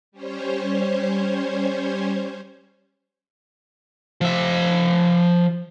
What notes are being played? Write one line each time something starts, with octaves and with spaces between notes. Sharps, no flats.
G3 C#4 C5 C#5
F3 E5